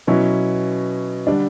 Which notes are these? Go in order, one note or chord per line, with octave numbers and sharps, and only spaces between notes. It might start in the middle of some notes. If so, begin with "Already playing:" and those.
B2 F#3 C#4 E4
D3 G3 D4